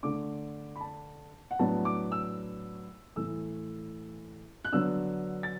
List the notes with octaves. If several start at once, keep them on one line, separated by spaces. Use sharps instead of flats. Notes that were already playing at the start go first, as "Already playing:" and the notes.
D3 A3 D4 D6
B5
A5
F#5
A2 F#3 B3 D4 A5
D6
E6
A2 E3 A3 E6
F#6
D3 F#3 B3 D4 E6
A6